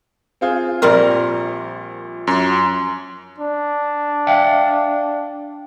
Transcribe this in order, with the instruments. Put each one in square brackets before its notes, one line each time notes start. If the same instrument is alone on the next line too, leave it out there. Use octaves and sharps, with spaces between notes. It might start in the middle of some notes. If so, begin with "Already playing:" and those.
[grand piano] C4 F4 G#4
[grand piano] A#1 A#2 [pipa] G3 C4 A#4
[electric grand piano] F#2 C6
[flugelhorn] D4
[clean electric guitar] E5 F5 G5